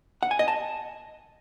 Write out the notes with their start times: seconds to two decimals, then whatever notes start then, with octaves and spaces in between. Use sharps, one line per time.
0.23 F#5
0.31 G#5
0.39 D#5
0.48 A5